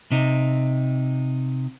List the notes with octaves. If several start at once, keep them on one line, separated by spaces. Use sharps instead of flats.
C3 D#4